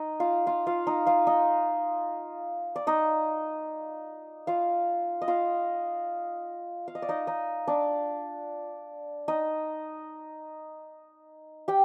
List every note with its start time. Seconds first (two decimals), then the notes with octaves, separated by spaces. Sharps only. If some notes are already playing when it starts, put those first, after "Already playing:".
Already playing: D#4 D#5
0.20 F4 F5
0.46 F4 F5
0.67 F4 F5
0.87 D#4 D#5
1.06 F4 F5
1.27 D#4 D#5
2.76 D5
2.87 D#4 D#5
4.47 F4 F5
5.22 D#5
5.28 F4 F5
6.88 F5
6.95 D#5
7.02 D5
7.09 D#4 D#5
7.27 D#4 D#5
7.67 D4 D5
9.28 D#4 D#5
11.68 G4 G5